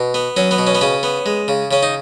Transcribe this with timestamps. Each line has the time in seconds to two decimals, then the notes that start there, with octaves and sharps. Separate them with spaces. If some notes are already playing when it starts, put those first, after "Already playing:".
Already playing: B2
0.14 B3
0.37 F#3 C#4
0.51 B3
0.58 B2
0.67 C#4
0.75 B3
0.81 C#3 C#4
1.03 B3
1.26 G#3
1.48 C#3
1.71 C#3 C#4
1.83 D#4